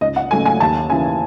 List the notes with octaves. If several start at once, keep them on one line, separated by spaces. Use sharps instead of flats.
C#2 D#5
F#5
C#3 F#3 A3 G#5
G#5
D#2 A5
C#3 E3 G#5